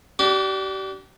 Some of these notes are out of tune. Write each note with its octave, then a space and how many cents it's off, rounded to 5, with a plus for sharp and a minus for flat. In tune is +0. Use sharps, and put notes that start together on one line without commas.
D4 +0 G4 -35